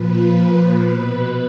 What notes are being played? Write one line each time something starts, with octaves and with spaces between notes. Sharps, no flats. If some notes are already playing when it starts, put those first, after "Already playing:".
Already playing: A#2 F3 B4
B2 B4